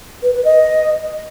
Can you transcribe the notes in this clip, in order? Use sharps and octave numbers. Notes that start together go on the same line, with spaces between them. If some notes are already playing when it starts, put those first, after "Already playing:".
B4
B4
D#5